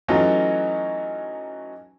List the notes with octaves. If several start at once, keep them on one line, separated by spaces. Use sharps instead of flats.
E3 F#3 A3 C#4 D#4 F4